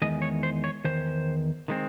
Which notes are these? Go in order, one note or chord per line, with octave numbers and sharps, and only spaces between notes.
E2 D#3 G#3 D#5
C#5
C5
C#5
E2 D#3 C5
D#3 G#3 C4